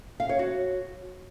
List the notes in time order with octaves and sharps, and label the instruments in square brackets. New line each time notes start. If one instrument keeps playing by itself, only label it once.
[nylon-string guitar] F5
C#5
F#4